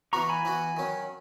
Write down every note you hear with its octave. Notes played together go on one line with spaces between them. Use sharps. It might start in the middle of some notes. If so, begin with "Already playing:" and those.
E3 B3 F#4 A#5 C#6
G#5 B5
E3 B3 F#4
D#3 F#3 C#4